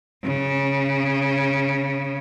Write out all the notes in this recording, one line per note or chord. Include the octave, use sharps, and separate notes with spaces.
C#3